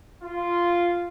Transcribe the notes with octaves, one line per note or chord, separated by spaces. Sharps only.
F4